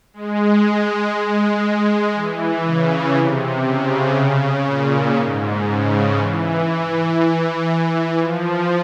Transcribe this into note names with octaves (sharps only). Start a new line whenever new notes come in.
G#3
G#3
E3
C#3
C3
C#3
A#2
G#2
C#3
E3
E3
F3